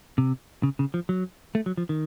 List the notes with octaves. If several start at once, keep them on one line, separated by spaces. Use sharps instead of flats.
C3
C#3
C#3
F3
F#3
A3
F#3
F3
D#3